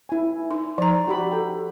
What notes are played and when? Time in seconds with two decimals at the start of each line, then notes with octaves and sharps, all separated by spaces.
0.09 E4 G#5
0.51 D#4
0.78 F3 D5 A#5
1.07 F#4 G4 B5
1.31 A4 G5